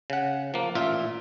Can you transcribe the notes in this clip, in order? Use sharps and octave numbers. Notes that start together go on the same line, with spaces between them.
C#3 F#5
F3 A#3
A1 A#2 F4 E5